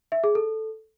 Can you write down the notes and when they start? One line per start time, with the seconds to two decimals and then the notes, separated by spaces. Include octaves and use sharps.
0.12 E5
0.24 G#4
0.35 A4